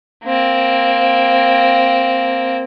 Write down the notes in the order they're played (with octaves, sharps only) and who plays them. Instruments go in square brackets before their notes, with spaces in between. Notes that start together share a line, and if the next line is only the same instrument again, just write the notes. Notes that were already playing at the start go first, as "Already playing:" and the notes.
[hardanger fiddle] A#3 C4